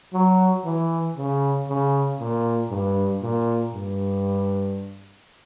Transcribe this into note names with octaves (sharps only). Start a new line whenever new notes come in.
F#3
E3
C#3
C#3
A#2
G2
A#2
G2